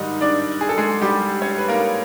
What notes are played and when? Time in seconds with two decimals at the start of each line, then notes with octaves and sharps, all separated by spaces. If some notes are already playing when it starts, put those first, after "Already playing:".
Already playing: G#2 D#3 G3 D#4 D#5
0.21 D4 D5
0.61 G#4
0.69 A4
0.78 G#3 G#4
1.02 G3 G4
1.42 C#4 C#5
1.58 B4
1.68 A#3 A#4